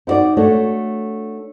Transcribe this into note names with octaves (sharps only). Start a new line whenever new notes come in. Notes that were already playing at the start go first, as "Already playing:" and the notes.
D#4 E4 F#4 D5
A3 D4 F#4 C#5